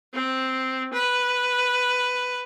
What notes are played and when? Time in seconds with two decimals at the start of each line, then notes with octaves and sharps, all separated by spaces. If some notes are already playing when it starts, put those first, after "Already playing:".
0.13 C4
0.93 B4